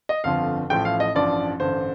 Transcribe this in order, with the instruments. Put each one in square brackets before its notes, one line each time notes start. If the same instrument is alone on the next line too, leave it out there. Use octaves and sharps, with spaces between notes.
[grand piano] D#5
G1 F2 D3 F3 F5
A1 A2 F3 G5
F5
D#5
A1 G2 F3 D5
A1 G2 D3 C5